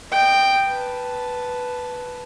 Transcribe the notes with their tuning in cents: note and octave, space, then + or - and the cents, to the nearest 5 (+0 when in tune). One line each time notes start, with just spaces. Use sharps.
D#5 -30 G5 +0
B4 +0 A5 -5